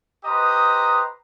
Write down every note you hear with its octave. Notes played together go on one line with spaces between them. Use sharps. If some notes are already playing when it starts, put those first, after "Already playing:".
G4 B4 C5 D#5 A#5 D#6